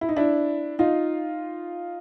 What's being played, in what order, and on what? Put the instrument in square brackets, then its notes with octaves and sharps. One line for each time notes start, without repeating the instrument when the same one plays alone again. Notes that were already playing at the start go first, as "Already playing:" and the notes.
[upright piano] E4
D#4
D4 E4
D#4 F4